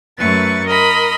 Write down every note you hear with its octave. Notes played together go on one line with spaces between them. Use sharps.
F#2 A3 B4 C#6 A6
A#4 D#5 B5 C6